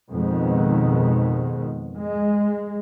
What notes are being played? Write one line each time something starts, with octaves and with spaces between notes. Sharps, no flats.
F2 B2 D#3 G#3
G#3